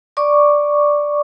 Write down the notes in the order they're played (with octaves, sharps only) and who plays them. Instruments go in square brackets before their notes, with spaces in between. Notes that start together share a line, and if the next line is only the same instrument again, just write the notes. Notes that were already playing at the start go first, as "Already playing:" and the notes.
[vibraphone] D5 C#6 D6